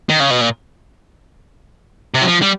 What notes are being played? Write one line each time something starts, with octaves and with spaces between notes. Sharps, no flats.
D#3
C#3
B2
A#2
C3
F#3
F3
G3